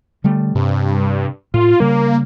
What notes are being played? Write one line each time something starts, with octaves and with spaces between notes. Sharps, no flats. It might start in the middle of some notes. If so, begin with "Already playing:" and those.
D3 G3 A3
G2 C3
A2 F4
C#3 G3 A#3